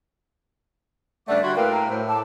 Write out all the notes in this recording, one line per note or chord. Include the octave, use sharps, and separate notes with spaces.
G2 C#3 A3 D5 E5 F#5 D6
D3 G3 F#4 C6 G#6
A2 A#3 B4 G5
A#5
A2 C5
A5 D6 E6